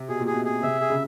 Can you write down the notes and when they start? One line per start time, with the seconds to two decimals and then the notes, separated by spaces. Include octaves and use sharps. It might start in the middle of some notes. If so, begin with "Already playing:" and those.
Already playing: C3
0.08 B2 G#4
0.20 A#2
0.26 B2 G#4
0.45 G#4
0.63 C3 E5
0.81 G#4
0.90 C#3